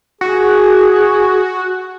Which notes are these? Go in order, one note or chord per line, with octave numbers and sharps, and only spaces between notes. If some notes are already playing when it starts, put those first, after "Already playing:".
F#4 G#4